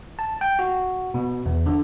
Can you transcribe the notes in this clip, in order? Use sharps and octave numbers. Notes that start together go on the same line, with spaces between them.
A5
G5
F#4
B2
E2
D3